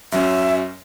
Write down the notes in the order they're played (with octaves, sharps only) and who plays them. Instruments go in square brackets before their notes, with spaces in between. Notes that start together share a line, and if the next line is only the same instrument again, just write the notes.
[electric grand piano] F#2 F#3 C#4 [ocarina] E5